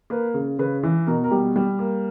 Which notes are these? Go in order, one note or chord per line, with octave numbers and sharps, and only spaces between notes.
A#3 B4
C#3
C#3 B4
E3
B2 A#4
A#4
G3 G4
G3
A#3